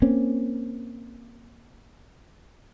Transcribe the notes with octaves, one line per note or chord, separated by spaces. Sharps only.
A#3 C4 C#4